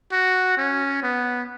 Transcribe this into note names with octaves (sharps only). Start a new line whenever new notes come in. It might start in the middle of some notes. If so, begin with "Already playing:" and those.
F#4
C#4
B3